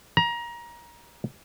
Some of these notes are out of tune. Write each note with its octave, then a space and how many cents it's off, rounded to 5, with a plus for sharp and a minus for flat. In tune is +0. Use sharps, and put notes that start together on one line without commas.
A#5 +25